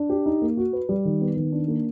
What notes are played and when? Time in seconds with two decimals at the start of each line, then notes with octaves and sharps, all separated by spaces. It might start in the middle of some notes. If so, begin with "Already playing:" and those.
Already playing: D4
0.10 G4
0.26 D#4
0.42 A#3
0.57 F#4
0.73 B4
0.89 G3
1.05 D#3
1.21 B3
1.37 D#3
1.52 D4
1.68 A#3